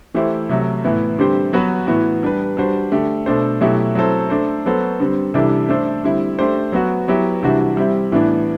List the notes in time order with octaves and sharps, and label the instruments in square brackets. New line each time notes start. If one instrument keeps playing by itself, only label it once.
[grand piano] E3 A3 E4 G4 C5
C3 F#3 A3
A2 E3 B3 E4
D3 G3 C4 G4 C5
F#3 B3 F#4 B4
A2 E3 B3 F#4
G3 D4 G4 B4
G3 D4 F#4 C5
D3 A3 D4 G4
B2 A3 D4 A4 C5
B2 F#3 A3 E4 G4
F#3 C4 E4 A4 C5
A3 D4 A4 C5
F#3 B3 F#4 A4 C5
D3 G3 C4
C3 E3 G3 D4 A4
A3 D4 A4 C5
D3 G3 C4 E4
A3 D4 G4 C5
F#3 B3 F#4
F#3 B3 E4 G4
C3 E3 G3 D4 F#4
G3 C4 E4
A2 E3 B3 D4